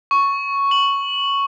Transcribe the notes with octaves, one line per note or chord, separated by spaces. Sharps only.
C#6
F#7